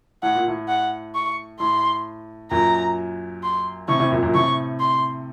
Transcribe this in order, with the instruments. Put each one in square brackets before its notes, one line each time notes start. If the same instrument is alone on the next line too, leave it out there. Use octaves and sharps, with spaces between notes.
[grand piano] A2 [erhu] F#5
[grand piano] A#2
A2
[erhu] F#5
C#6
[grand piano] A2 [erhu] C6
[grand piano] F#2 A#2 [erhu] A#5
[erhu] C6
[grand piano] A2 C3 [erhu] C#6
[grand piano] A2 C3
F#2 A#2
F#2 A#2
[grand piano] A2 C3 [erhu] C#6
[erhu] C6